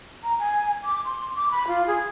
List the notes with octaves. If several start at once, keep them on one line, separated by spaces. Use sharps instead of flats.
A#5
G#5
D6
C6
D6
B5
F4
G#4